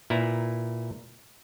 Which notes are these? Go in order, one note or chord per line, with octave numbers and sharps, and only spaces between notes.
A#2 E4 B4 A#5